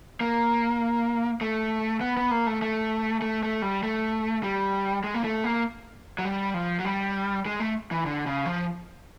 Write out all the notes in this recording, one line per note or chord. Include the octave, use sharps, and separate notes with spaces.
A#3
A3
B3
B3
A#3
A3
A3
A3
A3
G3
A3
G3
G#3
A#3
A3
A#3
F#3
G3
F3
F#3
G3
G#3
A3
E3
D3
C#3
F3